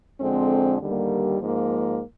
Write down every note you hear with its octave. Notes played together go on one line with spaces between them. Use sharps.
F2 D3 G#3 C4
D#2 D3 G3 A#3
G#2 F3 A#3